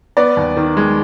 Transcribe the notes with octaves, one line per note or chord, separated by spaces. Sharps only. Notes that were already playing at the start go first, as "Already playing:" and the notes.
B3 D5
D#2
D#3
G#3